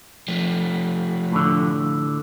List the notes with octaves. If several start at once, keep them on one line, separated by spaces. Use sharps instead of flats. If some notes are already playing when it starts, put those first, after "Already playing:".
F3 A3
A2 D3